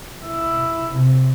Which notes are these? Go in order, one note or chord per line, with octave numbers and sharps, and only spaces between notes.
E4
C3